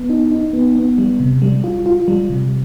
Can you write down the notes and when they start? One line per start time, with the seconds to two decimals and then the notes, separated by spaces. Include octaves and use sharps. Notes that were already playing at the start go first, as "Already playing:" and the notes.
Already playing: B3
0.10 D#4
0.32 D#4
0.53 B3
0.76 B3
0.98 G3
1.20 C3
1.42 G3
1.64 F4
1.86 F4
2.08 G3
2.30 C3